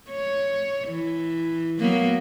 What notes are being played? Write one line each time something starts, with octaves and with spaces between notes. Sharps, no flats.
C#5
E3
F#3 A#3 B3